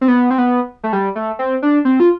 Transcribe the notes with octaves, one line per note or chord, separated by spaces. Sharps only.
C4
B3
C4
B3
A3
G3
A3
C4
D4
C4
F4